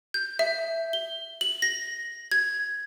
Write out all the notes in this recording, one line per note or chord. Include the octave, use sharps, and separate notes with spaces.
G6
E5
G7
F#7
A#6
G#6